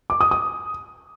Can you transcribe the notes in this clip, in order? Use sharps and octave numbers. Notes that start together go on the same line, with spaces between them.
D6
D#6
D#6